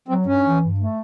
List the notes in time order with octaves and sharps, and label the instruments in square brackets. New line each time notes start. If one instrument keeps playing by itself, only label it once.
[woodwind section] F#3 [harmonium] C4
[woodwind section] G2 [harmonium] C#4
[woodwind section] E3
G2
A3